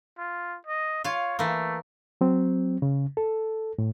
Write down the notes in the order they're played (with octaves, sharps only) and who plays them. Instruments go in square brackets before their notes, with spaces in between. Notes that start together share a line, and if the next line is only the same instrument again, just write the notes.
[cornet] F4
D#5
[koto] F4 F5 [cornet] C#5
[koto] E3 A#3 [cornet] A3
[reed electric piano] F#3 C4
C#3
A4
A2